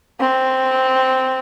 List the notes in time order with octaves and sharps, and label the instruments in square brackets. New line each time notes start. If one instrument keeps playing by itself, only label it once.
[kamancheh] C4